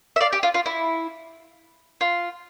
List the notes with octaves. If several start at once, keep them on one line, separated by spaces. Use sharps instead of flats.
E5
D5 F5
G4
F4
F4
E4
F4